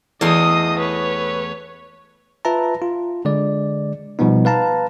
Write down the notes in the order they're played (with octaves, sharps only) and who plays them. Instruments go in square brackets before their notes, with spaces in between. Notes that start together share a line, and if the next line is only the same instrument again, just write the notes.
[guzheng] E2 A3 C6 [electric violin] D#5 D#6
[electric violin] B4 C#5
[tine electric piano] F4 B4 E5 A5 A#5
F4
D3 G#3 D5
B2 F3 G3 B3 D#4
B4 F5 A5 A#5